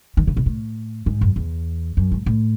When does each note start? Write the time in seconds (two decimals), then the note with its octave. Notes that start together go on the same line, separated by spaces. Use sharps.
0.17 D#3
0.27 C#3
0.37 B2
0.46 A2
1.06 G#2
1.21 F#2
1.36 E2
1.97 F#2
2.11 G#2
2.26 A2